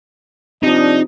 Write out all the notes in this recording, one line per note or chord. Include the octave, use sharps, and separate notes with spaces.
C3 F3 D4 D#4 D#5